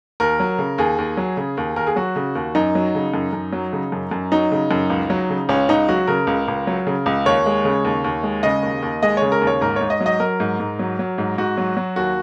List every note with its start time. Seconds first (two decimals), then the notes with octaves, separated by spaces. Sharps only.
0.20 D#2 A#4
0.40 F#3
0.59 C#3
0.78 D#2 G#4
0.98 D#2
1.17 F#3
1.37 C#3
1.57 D#2
1.76 D#2 A#4
1.87 G#4
1.96 F#3 F#4
2.16 C#3
2.35 D#2
2.55 F#2 D#4
2.75 F#3
2.95 C#3
3.14 F#2
3.33 F#2
3.53 F#3
3.73 C#3
3.92 F#2
4.11 F#2
4.32 F#3 D#4
4.52 C#3
4.71 F#2
4.90 C#2
5.10 F#3
5.30 C#3
5.49 C#2 C#4
5.69 C#2 D#4
5.89 F#3 F#4
6.08 C#3 A#4
6.27 C#2
6.48 C#2
6.67 F#3
6.87 C#3
7.06 C#2
7.26 D#2 C#5
7.46 G#3
7.65 C#3
7.85 D#2
8.04 D#2
8.23 G#3
8.43 C#3 D#5
8.63 D#2
8.82 D#2
9.03 G#3 D#5
9.17 C#3 C#5
9.32 A#4
9.41 D#2
9.47 C#5
9.61 G#2 A#4
9.76 G#2 C#5
9.90 D#5
10.01 F#3
10.06 D#5
10.20 F#3 A#4
10.40 G#2
10.59 G#2
10.79 F#3
10.99 F#3
11.18 G#2
11.38 G#2 F#4
11.58 F#3
11.77 F#3
11.96 D#2 F#4